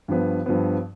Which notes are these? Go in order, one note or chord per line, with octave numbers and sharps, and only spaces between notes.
G2 F3 B3
G2 F3 B3